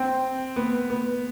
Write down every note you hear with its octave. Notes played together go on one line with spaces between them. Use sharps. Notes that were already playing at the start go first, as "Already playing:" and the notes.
Already playing: C4
B3
B3